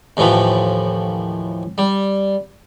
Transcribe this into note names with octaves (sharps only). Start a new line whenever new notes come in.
D#2 A2 E3 F3 B5
G3